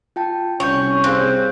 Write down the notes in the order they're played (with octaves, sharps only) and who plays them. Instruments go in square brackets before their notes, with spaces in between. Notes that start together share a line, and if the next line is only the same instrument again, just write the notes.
[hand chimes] F4 G5 A5
[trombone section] C2 C#4 [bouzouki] C#5 [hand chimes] C#6 G6
[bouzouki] C4 [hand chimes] G#4 F5 F#6